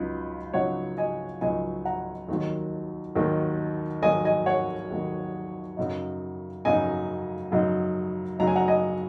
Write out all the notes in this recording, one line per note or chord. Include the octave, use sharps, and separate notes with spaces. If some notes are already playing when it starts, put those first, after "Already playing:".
Already playing: C#2 C#3 F#3 D#4
C#2 C#3 F#3 D#4 C#5 F#5
D#5 G#5
C#2 C#3 F#3 D#4 D#5 G#5
F#5 A#5
D#2 D#3 F#3
D#2 D#3 F#3
D#2 D#3 F#3 D#5 G#5
D#5 G#5
C#5 F#5
D#2 D#3 F#3
F#2 C#3 F#3 D#4
F#2 C#3 F#3 D#4 D#5 G#5
F#2 C#3 F#3 D#4
F#2 C#3 F#3 D#4 A#5
G#5
F#5 A#5
D#5 G#5